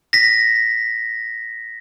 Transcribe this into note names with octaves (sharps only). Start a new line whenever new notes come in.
A#6 B6